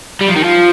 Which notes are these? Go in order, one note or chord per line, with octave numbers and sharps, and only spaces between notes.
G3
F3
D#3
F3